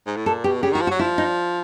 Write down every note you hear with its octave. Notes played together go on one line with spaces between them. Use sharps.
G#2
A2
A#2 A4
B2 G4
C#3 G4
D#3 F#4
F3
F#4
F#3
F3 E4
D#4